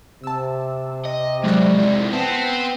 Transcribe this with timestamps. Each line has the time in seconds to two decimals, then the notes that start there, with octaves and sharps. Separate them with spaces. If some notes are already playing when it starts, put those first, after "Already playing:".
0.24 C3 A5 E6
1.06 D#5
1.44 C2 F2 F#3 G#3 D5
1.78 C4 E4
2.13 B3 C4 C5 A5